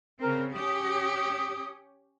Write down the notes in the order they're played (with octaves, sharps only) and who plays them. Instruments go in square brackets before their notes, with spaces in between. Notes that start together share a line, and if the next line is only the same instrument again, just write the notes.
[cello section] C#3 C4 [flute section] A#4
[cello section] C#4 G4 [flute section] D#6